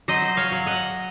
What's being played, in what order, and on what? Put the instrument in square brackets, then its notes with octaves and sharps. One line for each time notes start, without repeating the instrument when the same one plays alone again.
[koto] F#3 C5 D#5
C#5 F5
F#3
D#5 F#5